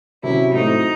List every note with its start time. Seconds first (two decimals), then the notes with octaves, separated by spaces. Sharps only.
0.23 C3 F#3 C#4 E4
0.53 A2 F#3 A3 C4 D#4 E4